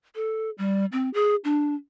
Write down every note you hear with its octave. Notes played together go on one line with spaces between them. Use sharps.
A4
G3
C4
G#4
D4